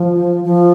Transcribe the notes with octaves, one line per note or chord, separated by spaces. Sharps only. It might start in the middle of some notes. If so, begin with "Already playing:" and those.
Already playing: F3
F3